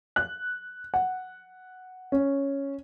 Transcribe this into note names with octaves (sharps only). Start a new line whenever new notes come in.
F#6
F#5
C#4